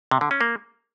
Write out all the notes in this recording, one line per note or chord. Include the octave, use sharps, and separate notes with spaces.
C3
D3
C#4
A#3